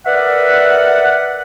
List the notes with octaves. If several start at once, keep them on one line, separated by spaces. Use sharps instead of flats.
A#4 B4 D5 E5 F#5